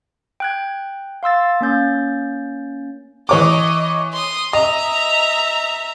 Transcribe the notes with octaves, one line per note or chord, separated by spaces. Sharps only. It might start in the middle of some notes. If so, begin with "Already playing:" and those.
G5 F#6 G#6
F5 C6 E6 A6
A#3 C#4 G6 A6
E3 C#5 D#5 D6
C6 D#6
D#5 E5 A#5